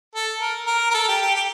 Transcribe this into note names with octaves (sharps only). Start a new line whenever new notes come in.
A4
A#4
A#4
A#4
A4
G4
G4
G4